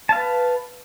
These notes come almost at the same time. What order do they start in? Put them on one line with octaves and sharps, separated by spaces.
A5 F5 B4